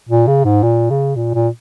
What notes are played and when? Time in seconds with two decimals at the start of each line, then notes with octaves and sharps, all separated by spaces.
0.09 A#2
0.27 C#3
0.45 G#2
0.63 A#2
0.90 C#3
1.16 A#2
1.34 A#2